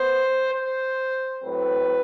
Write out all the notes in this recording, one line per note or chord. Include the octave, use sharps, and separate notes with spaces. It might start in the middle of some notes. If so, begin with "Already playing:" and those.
Already playing: B3 C5
C5
A2 F#3 C4 B4